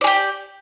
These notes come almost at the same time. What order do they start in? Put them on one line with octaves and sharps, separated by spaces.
D5 G#4 G4